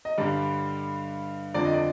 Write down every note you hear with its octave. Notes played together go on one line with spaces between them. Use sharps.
D#5
G2 D3 G3 D5
F2 D3 F3 D5
D#5
D5